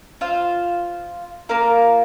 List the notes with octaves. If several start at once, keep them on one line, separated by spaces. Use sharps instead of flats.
F4 C5 F5
A#3 F4 A#4 F5